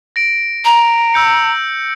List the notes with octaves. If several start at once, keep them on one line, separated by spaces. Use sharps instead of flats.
A#6 D7
A#5
E6 G6 C#7